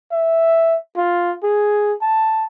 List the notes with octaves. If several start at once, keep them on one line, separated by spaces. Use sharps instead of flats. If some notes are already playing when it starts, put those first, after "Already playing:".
E5
F4
G#4
A5